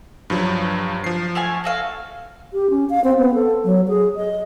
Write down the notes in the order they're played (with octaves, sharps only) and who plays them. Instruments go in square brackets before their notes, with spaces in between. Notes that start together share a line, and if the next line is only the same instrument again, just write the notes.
[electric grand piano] G2 F3 F#3
F3 C7
[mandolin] A3 F5 G#5
F#4 A4 F5
[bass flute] G4
C#4
F5
C4
B3
A4
F#3
G#4
D#5